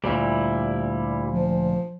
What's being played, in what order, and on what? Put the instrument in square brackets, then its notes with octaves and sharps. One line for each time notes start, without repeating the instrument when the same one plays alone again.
[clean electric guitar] D2 A#2 [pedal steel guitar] G3 E4
[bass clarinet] F3